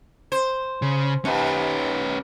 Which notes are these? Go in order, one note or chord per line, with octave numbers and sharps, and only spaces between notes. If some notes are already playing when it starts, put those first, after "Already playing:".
C5
C#3
D#2 C#4 B4